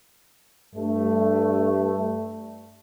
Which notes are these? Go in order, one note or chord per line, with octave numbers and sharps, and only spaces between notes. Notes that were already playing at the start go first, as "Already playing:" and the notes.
G2 A3